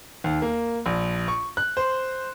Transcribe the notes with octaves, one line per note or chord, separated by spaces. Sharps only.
D#2
A#3
A#1
C#6
F#6
C5